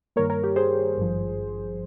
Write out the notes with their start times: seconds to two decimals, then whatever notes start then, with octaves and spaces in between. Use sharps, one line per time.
0.16 G2 D#3 G3 A#3 A#4 C#5
0.30 A#4 C#5
0.43 G4 A#4
0.56 G#4 C5
0.97 G#1 G2 F3